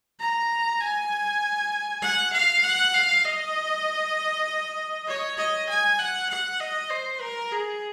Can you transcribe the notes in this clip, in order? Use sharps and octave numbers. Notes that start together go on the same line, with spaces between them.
A#5
G#5
F#5
F5
F#5
F5
D#5
C#5
D#5
G#5
F#5
F#5
D#5
C5
A#4
G#4